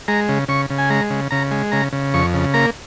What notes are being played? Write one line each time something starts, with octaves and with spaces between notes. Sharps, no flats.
G#3 A#5
C#3
C#3 C#6
C#3
G#5
G#3 A#5
C#3
C#3 A#5
G#3
C#3 A#5
C#3
F2 C#6
C#3
A#3 A#5